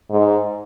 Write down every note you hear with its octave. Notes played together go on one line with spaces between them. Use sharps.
G#2